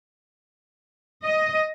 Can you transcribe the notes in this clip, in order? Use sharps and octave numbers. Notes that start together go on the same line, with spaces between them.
D#5